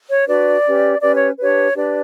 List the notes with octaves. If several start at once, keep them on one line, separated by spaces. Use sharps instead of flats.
C#5
D4 F#4 B4 D5
C#4 G4 B4
C#4 G4 B4 D5
C#5
D4 G4 B4 C#5
D4 G4 B4 D5